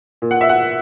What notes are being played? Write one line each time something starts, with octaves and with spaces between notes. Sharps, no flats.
A#2
F#5
E5
F#5